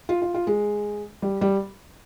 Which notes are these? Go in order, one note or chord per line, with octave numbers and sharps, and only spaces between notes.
F4
F4
F4
G#3
G3
G3